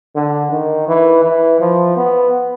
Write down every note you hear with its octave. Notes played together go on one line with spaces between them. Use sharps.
D3
D#3
E3
E3
F3
B3